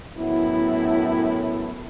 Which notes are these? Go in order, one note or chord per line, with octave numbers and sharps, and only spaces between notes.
F#2 A2 B3 E4